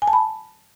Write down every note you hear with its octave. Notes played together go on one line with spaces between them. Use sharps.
G#5
A5
B5